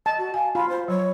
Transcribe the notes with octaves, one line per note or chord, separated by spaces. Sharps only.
D#5 A5
F#4
F5 G#5
F4 B5
C5
F#3 C#5